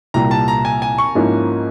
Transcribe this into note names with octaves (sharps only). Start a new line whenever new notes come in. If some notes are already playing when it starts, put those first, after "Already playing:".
C2 A#2 G3 A#5
A5
A#5
G#5
G#5
C#6
G#2 F3 A#3 C#4 E4